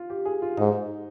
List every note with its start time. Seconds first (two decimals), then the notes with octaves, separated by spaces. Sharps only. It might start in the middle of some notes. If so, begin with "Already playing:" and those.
Already playing: F4
0.10 G4
0.25 G#4
0.42 F4
0.58 G#2 D#4